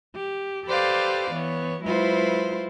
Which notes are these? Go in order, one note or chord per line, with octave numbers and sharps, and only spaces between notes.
G4
G4 A4 B4 C5 D5 F5
E3 B3 C#5
F#3 G#3 E4 F4 B4 C5